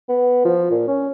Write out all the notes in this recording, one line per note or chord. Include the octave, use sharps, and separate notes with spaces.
B3
F3
A#2
C#4